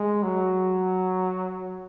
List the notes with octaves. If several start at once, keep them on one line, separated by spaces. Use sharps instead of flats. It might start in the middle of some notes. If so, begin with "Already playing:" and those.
Already playing: G#3
F#3